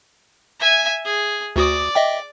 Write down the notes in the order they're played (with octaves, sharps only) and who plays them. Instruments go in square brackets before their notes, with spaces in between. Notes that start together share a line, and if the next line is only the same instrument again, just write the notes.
[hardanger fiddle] E5 G#5
G#4
[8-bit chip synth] D2 F#4 D#6 [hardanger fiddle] D5 D6
[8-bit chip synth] D#5 E5 G5